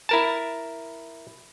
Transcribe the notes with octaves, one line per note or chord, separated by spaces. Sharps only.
E4 A#4 A5